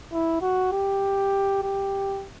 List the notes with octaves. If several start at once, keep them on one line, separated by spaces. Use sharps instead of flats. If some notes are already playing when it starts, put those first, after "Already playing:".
E4
F#4
G4
G4